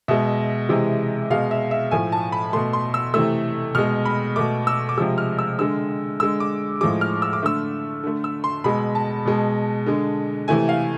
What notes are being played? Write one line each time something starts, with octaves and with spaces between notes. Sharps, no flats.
B2 G#3 E5
C3 E3 G#3
B2 G#3 F5
E5
E5
A2 F3 A3 G#5
A5
B5
B2 A3 C6
C6
E6
C3 E3 A3 E6
B2 G#3 F6
B5
B2 A3 D6
E6
D6
C3 F3 G#3 E6
F6
E6
D3 G#3 E6
D3 G#3 E6
D6
A2 F3 G#3 D6
F6
E6
D6
D3 A3 E6
D3 A3
E6
C6
B2 G#3 B5
A5
B2 G#3
D3 G#3
C3 E3 A3 G#5
F5